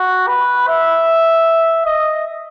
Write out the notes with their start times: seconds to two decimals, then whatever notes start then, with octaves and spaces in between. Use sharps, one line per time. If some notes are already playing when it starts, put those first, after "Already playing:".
Already playing: F#4
0.27 B4
0.67 E5
1.85 D#5